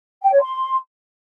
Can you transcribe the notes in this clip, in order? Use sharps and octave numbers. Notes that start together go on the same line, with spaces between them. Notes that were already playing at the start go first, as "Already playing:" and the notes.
G5
C#5
C6